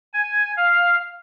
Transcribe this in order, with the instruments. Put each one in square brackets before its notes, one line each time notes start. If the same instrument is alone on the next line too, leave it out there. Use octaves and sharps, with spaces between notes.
[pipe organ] G#5
F5